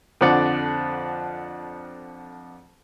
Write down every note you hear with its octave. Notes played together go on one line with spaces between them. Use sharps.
F2 D3 F3 D4 D5 F#5